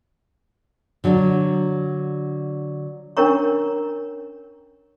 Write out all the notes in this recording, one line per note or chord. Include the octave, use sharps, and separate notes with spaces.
D3 F#3 D4
C#4 D4 A#4 C#5 A#5 C#6